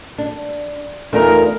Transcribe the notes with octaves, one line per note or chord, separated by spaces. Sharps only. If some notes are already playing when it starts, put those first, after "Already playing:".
D4
E2 A3 D4 D#4 F4 A#4